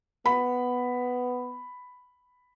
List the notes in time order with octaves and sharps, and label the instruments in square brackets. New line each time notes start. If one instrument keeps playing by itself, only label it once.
[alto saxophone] B3 [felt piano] B5